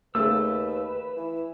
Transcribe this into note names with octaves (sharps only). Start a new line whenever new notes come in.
D#2 C#3 A3 B4 E6
E3